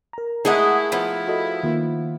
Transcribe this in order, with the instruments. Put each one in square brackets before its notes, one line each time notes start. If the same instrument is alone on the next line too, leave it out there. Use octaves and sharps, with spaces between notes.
[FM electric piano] A#4 A#5
[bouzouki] G#3 D#5 F#5 [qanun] A3 G#4 [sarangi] E4
[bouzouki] F3 B3 [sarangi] E4
[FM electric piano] F#4 A4 D#5
D#3 A#3 F4